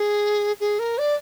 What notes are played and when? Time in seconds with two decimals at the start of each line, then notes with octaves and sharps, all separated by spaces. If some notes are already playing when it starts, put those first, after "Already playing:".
Already playing: G#4
0.60 G#4
0.79 A#4
0.98 D5